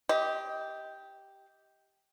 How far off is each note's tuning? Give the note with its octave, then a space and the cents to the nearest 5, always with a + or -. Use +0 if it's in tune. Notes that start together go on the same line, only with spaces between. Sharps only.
G4 +0 D#5 +30